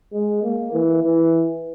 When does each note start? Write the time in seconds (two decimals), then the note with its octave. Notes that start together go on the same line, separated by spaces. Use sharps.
0.13 G#3
0.43 A#3
0.73 E3
1.03 E3